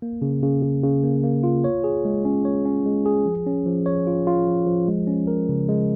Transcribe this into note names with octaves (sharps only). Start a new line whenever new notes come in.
A#3
C#3
C#3
C#3
C#3
A#3
A#3
F4
C#5
G#4
G#3
C#4
C#5
C#4
G#3
G#4
F3
C#4
F3
C#5
F4
F4
F3
F3
G#3
C#4
A#4
C#3
G#3